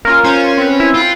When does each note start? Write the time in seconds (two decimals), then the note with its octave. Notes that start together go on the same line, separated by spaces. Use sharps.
0.05 A#3 C#4 F4 A#4
0.24 C#4 F4 C5 G#6
0.57 C4 B4
0.80 E4
0.94 F4 G5 F#6